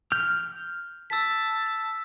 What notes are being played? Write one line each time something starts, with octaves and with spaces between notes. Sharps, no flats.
F6 G6
A5 E6 B6